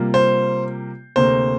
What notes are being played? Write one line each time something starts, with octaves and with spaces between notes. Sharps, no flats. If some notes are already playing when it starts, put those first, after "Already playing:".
Already playing: C3 G3 A#3 F4
C5
D2 C3 A#3 C5